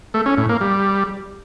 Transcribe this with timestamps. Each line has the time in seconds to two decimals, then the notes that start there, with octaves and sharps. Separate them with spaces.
0.14 A3
0.26 C#4
0.38 A2
0.49 A#3
0.61 G3